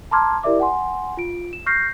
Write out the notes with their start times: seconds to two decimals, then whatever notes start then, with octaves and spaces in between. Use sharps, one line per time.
0.11 A5 A#5 C6 D6 F6 G#6
0.43 E4 G4 A#4 D5 E5 D6
0.60 F#5 G#5 C6
1.17 F4 D7
1.53 E7
1.66 C#6 F6 G6 A#6 C7